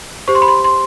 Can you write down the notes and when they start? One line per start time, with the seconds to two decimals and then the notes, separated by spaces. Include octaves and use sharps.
0.28 G4 C5 C#6
0.35 C6
0.42 B5
0.48 C6
0.64 C6